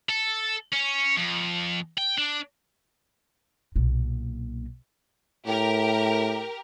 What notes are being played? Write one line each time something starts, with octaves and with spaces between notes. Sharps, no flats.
A4
C#4
F2
G5
D4
B1 A#2
A2 G4 A#4